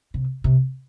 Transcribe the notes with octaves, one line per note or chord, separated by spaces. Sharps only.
C3
C3